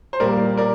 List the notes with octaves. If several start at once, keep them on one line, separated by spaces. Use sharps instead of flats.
C5
A#2 G3 A#3 A#4 D5
A#4 D5